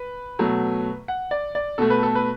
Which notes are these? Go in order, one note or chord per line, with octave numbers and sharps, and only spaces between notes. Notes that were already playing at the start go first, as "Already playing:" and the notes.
Already playing: B4
B2 F#3 A3
F#5
D5
D5
B2 A3 A4
B4
A4
B4